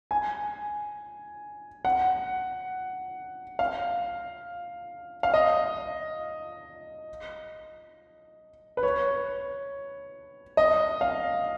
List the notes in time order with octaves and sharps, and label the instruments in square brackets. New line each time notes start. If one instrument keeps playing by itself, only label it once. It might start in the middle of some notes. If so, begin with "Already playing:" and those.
[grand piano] G#5
F#5
F5
F5
D#5
B4
C#5
D#5
F5